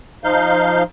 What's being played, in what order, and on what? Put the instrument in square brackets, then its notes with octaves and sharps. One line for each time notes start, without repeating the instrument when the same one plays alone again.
[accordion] F3 D#4 F5 G6